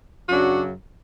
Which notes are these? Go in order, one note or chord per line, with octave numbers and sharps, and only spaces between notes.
F#2 C#3 F#3 D4 F#4